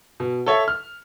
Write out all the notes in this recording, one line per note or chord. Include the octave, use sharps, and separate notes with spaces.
B2
A4 C#5 E5
F6